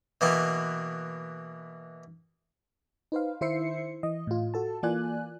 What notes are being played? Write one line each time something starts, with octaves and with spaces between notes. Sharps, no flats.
B2 E3 A#3 B3
D#4 B4 C5 F5
D#3 E4 C5 E5 C7 C#7
E3 D#5
A2 F4
F#4 A4 A5
E3 A#3 F4 D5 G#5 F#6